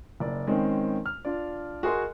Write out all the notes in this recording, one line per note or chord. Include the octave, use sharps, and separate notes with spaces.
F#1 D5
D#3 G#3 C4 C#4
F6
D4 F4 D5
F#4 G#4 A#4 D#5 G#5 C6